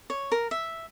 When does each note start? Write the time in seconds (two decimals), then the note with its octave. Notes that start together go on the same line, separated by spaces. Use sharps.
0.10 C#5
0.32 A#4
0.51 E5